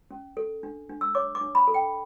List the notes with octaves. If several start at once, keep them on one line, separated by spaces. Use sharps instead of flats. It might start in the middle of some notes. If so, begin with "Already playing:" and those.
C#4
A4
D4
D4
E6
C#5 D6
D6
D4
B5
A4
G5